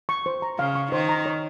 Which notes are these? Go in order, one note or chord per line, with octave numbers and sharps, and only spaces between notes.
C#6
C5
A#5
C#3 F5
C#6
D#3 C5
A#5
C#5